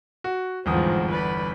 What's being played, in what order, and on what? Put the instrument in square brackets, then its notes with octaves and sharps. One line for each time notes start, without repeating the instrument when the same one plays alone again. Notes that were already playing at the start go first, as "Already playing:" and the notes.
[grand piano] F#4
[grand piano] G1 E2 D#6 [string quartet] G#2 F3 C4
[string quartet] B4 D5 B5